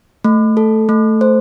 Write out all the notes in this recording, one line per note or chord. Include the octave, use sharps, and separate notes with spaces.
A3
A4
A3
C5